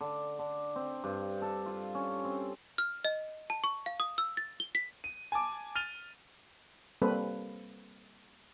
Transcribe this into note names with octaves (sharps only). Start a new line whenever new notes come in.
D3
D3
C4
G2
A4
F4
C#4
C4
F6
D#5
A5
C#6
F5
D#6
E6
A6
G7
B6
D#7
G#5 A5 D6
F6 A6 D#7 F7 G7
G3 A#3 C4 A4 B4